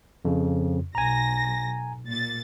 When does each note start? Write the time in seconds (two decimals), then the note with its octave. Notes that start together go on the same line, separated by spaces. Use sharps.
0.25 F2 C#3
0.95 B1 G#5 A#5 A#6
2.09 A#2 A6